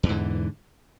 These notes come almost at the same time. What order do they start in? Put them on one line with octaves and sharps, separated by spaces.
E2 E3 G#2 D3